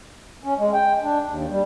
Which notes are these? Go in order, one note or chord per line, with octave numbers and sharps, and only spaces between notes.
C#4
G#3
G5
D4
D#2
G3